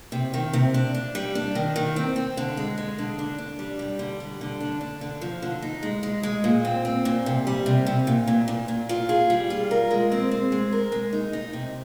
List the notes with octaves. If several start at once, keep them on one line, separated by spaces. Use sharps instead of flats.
C3
D#3
C3
D4
D4
G3
D4
D#3
D#3
C4
C4
D3
G#3
G#3
D3
D4
D4
G3
G3
D3
G3
D3
D4
D4
D3
F3
D3
D#4
G#3
G#3
G#3
A#2
C4
C4
A#2
C3
G3
C3
C3
A#2
A#2
A#2
A#2
F4
G#4
G3
F4
A#4
G#3
C4
C4
G#3
A#4
G#3
D#4
D#4
C3